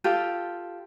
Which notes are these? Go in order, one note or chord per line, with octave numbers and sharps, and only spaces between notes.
F4 G4 A4